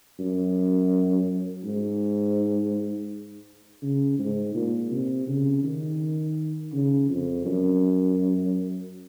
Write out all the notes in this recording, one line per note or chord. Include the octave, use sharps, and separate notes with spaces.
F#2
G#2
C#3
G#2
A#2
C3
C#3
D#3
C#3
F2
F#2